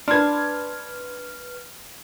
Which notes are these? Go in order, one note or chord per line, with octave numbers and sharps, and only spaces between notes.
D4 B4 C6 F6 G#6